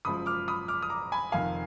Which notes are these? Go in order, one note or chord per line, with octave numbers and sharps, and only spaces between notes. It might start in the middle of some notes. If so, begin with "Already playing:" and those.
F#1 F#2 F3 G#3 B5 D#6
D6 F6
B5 D#6
D6 F6
D#6
A#5 D6
G#5 B5
F1 F2 D#3 F5 G#5